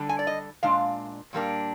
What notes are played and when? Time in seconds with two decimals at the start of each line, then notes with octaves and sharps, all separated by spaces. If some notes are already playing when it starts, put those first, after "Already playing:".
Already playing: D3 G3 D4
0.09 G#5
0.19 D5
0.27 D#5
0.63 A#2 G#3 D4 F5
1.33 A#2 G3 A#3 D4